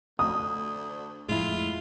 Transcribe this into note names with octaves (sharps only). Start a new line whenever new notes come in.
D2 D#6
F2 A2 G#3 E4 F4